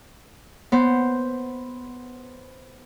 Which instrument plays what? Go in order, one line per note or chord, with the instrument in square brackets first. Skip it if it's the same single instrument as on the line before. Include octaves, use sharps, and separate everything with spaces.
[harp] B3 C5